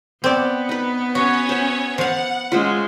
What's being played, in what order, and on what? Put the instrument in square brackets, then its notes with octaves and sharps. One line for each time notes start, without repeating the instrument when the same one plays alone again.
[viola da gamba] B3 [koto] C4 D5
[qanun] D#4 B4
[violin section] C#4 C#5 [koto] F#4
[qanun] C5 E5
[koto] F3 F5 [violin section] F#5
[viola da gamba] G#3 C#4 [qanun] F4 C5 E5